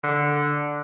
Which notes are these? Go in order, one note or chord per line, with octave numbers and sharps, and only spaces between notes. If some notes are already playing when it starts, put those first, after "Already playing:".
D3